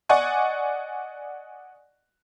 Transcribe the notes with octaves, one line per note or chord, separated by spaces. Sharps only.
D5 D#5 F#5 G#5 C#6